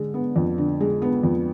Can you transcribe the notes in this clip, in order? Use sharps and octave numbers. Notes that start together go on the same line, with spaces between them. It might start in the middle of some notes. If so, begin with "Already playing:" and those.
Already playing: D3 G#3
B3
F2
D3
G#3
B3
F2